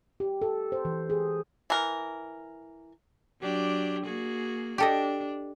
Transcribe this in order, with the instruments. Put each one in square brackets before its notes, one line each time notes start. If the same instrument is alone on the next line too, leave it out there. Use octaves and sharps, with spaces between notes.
[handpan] G4
A4
C5
E3
G#4
[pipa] E3 A#4
[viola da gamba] F#3 D4 G4
A#3 F#4 G#4
[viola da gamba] D4 [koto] G4 A4 D#5